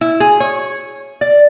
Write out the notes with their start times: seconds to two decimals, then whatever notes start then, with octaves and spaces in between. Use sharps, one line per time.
0.01 E4
0.20 G#4
0.40 C#5
1.21 D5